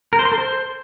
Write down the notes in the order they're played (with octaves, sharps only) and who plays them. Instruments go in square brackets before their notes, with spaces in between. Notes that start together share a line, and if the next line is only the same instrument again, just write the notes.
[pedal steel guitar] A#4
C5
C6
A4
C5